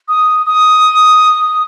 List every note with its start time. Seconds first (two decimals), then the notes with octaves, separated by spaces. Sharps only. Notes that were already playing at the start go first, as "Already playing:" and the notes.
0.08 D#6
0.46 D#6